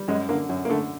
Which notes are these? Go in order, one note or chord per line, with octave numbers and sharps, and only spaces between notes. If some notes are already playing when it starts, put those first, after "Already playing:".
Already playing: G3
F#2 G#3
D3 A#3
F#2
A#3
D3 A3